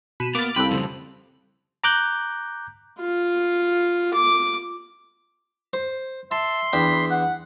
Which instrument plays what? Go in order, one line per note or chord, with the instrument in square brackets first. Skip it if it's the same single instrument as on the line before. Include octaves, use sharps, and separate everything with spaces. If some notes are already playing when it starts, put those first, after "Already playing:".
[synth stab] B2 D#7 E7 [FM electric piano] B5
[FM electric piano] A#3 A6 [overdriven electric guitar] B3 [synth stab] D6 F6
[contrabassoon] C2 [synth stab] F4 A4 [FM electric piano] G5 D6 F#6 [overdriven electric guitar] B5
[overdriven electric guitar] F2 C#3 [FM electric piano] G3 C5
[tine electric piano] A#5 D6 F#6 G6
[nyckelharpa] F4
D6
[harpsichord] C5
[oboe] E5 [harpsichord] A5 [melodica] C6
[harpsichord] E2 D4 G5 [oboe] B5
[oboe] F#5